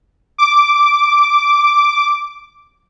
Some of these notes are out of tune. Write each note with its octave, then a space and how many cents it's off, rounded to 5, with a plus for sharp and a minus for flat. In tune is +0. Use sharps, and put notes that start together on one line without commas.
D6 -5